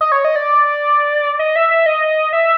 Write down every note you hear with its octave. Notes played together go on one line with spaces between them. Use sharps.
D#5
C#5
D#5
D5
D#5
E5
E5
D#5
E5